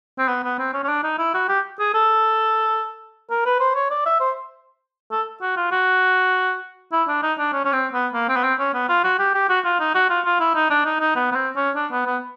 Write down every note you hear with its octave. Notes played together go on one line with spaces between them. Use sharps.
C4
B3
B3
C4
C#4
C#4
D4
D#4
E4
F#4
G4
G#4
A4
A#4
B4
C5
C#5
D5
E5
C5
A4
F#4
F4
F#4
E4
D4
D#4
D4
C#4
C#4
C4
B3
A#3
C4
B3
C4
C#4
B3
F4
F#4
G4
G4
F#4
F4
D#4
F#4
F4
F4
E4
D#4
D4
D#4
D#4
B3
B3
C4
C#4
D4
B3
B3